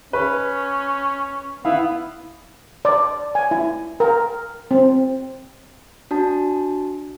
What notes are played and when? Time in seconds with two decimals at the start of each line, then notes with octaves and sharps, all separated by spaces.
0.13 C#4 B4
1.65 B3 E4 F5
2.85 D5
3.35 G#5
3.51 E4
4.00 A#4
4.71 C4
6.11 D4 F#4 A5